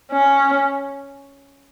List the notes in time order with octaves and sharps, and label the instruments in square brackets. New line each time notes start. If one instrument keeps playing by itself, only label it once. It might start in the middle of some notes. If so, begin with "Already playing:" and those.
[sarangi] C#4